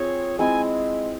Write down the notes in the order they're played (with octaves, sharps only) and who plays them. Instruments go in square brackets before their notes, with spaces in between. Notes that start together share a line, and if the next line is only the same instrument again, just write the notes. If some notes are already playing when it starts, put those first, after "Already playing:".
Already playing: [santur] C4 F4 G#4 [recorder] C#5
[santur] G#3 C4 E4 [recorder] G#5